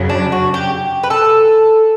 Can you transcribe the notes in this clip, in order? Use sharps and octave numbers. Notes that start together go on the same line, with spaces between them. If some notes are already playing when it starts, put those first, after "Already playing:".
Already playing: F#2 C#3 F#3 C#4
D4
F#4
G4
B4
A4